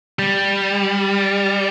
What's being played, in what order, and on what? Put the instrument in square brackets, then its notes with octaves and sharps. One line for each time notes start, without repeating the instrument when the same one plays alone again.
[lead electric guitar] G3